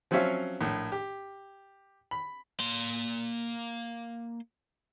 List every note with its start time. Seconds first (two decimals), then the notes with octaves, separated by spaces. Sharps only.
0.11 F3 F#3 C4 C#4 E5 F5
0.61 A#1 A2
0.92 G4
2.11 B5
2.60 A#3 C6